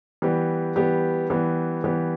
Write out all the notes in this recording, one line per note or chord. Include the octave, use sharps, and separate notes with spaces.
E3 G3 B3 G4
E3 G3 B3 G4
E3 G3 B3 G4
E3 G3 B3 G4